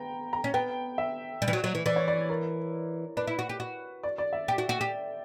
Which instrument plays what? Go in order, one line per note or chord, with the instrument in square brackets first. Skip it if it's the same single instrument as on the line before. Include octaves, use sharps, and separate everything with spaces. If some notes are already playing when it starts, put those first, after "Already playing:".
Already playing: [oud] B3 [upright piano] G5 A#5
[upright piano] A#5
[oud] C#4
[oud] B3 [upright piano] G5
[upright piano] E5
[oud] G3
E3
F#3
F#3
E3
[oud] E3 [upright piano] D5
[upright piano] C#5
D5
A#4
[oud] D4 [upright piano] B4
[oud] E4
F#4
G4
F#4
[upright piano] D5
D5
E5
[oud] G4 [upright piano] G5
[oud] F#4
F#4
G4